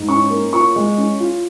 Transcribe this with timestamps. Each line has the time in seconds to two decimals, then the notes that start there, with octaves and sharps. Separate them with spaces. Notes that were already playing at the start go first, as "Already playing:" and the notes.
Already playing: G#2
0.09 C#4 C#6
0.30 A#3
0.53 F4 C#6
0.76 G#3
0.98 C#4
1.20 F4